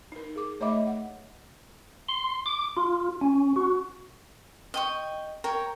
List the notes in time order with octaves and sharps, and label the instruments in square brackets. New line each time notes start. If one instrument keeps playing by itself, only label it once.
[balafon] D#4 A#4
G#4 D6
A3 C#5 D#5 E5 B5 D6
F#5
[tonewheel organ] C6
D6
F4
C#4
F#4
[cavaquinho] D#5 G5 C#6
A#4 C#5 G5